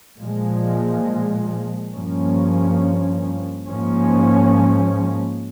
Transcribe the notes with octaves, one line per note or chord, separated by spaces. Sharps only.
A#2 F3 G#3
G2 F3 A#3 C#4
G#2 F3 A#3 C#4